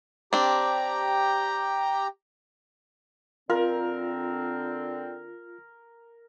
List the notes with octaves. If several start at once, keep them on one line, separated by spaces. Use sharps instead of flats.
C4 D4 G4 G5 A#5
D3 C4 F4 A#4